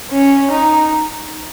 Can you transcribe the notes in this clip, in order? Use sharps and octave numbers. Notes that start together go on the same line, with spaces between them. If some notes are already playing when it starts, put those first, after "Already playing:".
C#4
D#4